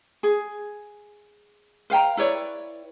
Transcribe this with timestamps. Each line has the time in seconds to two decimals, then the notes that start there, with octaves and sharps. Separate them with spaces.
0.23 G#4
1.90 B4 F5 G5 A#5
2.17 E4 B4 C#5 D5